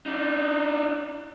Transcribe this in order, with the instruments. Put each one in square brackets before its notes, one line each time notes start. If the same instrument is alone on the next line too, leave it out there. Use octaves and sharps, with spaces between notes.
[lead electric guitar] D4 D#4